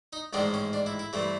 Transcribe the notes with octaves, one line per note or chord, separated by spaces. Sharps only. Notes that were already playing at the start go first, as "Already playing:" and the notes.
D#4
A1 G#2 D#3 G#3 C4 D4
C#4
D4
E4
E4
G2 E3 A3 C4